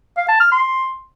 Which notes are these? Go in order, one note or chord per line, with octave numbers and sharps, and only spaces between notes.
F5
A5
F6
C6